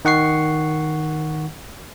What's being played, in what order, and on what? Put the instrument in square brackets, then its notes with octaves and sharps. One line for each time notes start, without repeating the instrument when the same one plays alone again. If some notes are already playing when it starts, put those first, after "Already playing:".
[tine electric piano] D#3 F#5 C#6 C7